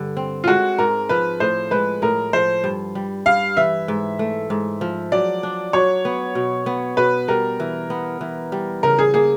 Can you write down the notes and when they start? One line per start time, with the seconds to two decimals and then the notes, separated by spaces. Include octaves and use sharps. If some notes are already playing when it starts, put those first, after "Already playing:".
Already playing: G2 D3
0.17 C4
0.44 F4
0.48 G#3 F#4
0.78 G#2 A#4
1.09 F3 B4
1.40 A2 C5
1.71 G#3 B4
2.02 A2 A#4
2.33 F3 C5
2.64 G2
2.95 G3
3.26 G2 F5
3.57 E3 E5
3.88 G#2
4.19 A3
4.50 G#2
4.81 F3
5.12 F#3 D5
5.43 D4
5.73 F#3 C#5
6.05 B3
6.35 B2
6.66 B3
6.97 B2 B4
7.28 G3 A#4
7.60 E3
7.90 B3
8.21 E3
8.52 G3
8.83 C#3 A#4
8.99 G#4
9.14 A#3 G#4